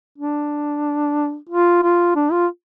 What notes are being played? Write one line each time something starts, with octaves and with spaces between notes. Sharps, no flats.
D4
F4
F4
D4
F4